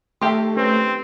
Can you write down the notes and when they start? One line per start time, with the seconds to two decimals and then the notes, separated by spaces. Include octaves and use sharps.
0.21 D#3 A3 G4 E5 A5 C6
0.57 C4 C#4 B4